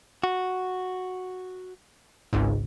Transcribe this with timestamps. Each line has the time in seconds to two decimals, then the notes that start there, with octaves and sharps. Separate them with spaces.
0.24 F#4
2.33 G#1 C#2 G#2